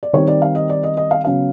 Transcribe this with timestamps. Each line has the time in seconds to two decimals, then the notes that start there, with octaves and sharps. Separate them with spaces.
0.03 D5
0.13 D#3 G3 C4 C#5
0.28 D5
0.42 F5
0.55 D#5
0.69 D5
0.83 D#5
0.97 D#5
1.11 F5
1.25 C#3 F#3 B3 F5